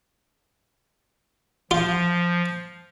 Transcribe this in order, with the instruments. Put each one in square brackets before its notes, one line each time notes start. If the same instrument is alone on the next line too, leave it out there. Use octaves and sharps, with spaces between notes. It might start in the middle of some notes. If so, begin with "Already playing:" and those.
[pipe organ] F3 [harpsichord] F4